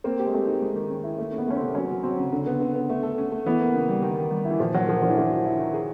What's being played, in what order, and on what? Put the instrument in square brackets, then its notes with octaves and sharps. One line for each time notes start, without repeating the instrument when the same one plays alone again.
[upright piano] A#3 [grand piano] C4
[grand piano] G4
[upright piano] G#3
[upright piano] A3 [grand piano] C4
[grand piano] D#4
G#3
D#3
C#4
E4
[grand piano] A3 [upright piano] A#3
[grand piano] C#4
[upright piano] B3
[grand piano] A3 [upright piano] C#4
[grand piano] C3 [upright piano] C4
[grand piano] F#3 [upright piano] C#4
[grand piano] F#3
[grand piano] F#3 [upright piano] C4
[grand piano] C#3
D3
B3
D3
B3
A3
A4
C#4
A3
[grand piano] E3 [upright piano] B3
[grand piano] A#3
C#3
G3
D#3
D#3
G3
E4
[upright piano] E3
[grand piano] A#2 [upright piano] F3
[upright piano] F#3 [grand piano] A#3
[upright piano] F3 [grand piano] A#3
[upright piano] F3 [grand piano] D4
[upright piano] E3
[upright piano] F3 [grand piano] E4
[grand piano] F#3
E4
D#3
G#4